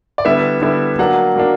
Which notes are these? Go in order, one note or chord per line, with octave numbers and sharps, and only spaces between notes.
D5
D3 G3 B3 E4 E5
D3 G3 B3 E4
F#3 A#3 D4 F#5
F#3 A#3 D4